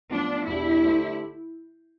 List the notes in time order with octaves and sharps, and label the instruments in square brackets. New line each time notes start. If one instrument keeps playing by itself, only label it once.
[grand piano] A2 F3 B3 F4 [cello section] D4
[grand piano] E2 B2 B3 D4 G4 [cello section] E4
[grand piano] D3 A3 D4 G4 C5